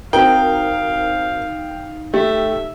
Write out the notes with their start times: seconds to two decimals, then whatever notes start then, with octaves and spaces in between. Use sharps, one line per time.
0.13 C4 D#4 F#4 A#4 F5 G5
2.14 A3 G4 E5